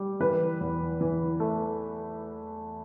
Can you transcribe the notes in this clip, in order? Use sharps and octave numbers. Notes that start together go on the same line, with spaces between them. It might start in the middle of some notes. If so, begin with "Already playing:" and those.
Already playing: G3
E3 B4
E2
E3
A3